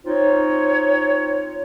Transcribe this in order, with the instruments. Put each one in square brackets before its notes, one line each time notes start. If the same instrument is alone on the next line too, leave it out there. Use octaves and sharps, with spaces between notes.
[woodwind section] C4 D#4 F4 C#5